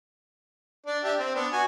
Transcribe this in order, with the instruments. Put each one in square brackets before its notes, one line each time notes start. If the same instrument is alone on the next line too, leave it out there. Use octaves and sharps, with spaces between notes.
[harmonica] D4 D5
D4 G4 E5
C4
B3 D4
F#4 G#5